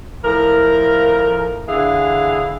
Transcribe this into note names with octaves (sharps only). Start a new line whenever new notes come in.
A2 F3 A#4
D3 E3 G#4 F5